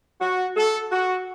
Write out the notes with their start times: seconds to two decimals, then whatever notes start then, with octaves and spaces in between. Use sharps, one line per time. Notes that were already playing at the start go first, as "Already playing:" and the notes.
0.21 F#4
0.56 A4
0.92 F#4